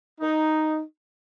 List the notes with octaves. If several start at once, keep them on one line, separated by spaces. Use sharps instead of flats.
D#4